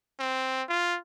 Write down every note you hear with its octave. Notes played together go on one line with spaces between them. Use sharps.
C4
F4